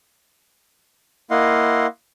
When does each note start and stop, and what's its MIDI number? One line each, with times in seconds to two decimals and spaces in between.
1.31 1.86 58
1.31 1.86 64
1.31 1.86 75
1.31 1.86 77
1.31 1.86 78
1.31 1.86 84